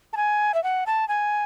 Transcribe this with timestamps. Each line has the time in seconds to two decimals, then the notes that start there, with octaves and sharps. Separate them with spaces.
0.13 A5
0.17 G#5
0.54 E5
0.64 F#5
0.87 A5
1.08 G#5